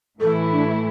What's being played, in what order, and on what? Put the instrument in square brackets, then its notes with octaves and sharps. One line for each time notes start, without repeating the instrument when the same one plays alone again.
[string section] A2 E3 A3 E4 [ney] A4
[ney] D4